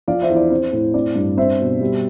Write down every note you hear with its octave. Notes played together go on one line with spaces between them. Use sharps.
F3 D5 F5
C5 E5
E2
D5
C4 C5
A2
C4 D5
G2
C4 C5 E5
B2
G3